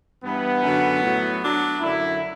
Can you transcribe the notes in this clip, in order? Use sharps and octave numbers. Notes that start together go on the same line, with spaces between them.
G2 E3 B3
F#2 D3 F#3
A2 F#3
A2 F#3 D4
F#2 D3 F#3 E4